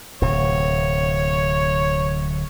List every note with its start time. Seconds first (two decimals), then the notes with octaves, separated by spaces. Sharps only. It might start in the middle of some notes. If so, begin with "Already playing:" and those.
0.22 D1 C3 C#5